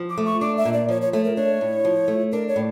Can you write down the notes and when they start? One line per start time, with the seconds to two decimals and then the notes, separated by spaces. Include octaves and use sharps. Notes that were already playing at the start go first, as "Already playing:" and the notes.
Already playing: F3
0.10 D6
0.18 A3
0.26 C#6
0.41 D4 D6
0.57 E5
0.65 A#2
0.73 D5
0.89 F3 C#5
1.02 C#5
1.13 A3 C#5
1.25 A#4
1.36 D4 C#5
1.61 A2
1.85 F3
2.08 A3
2.32 D4 A#4
2.48 C#5
2.56 A2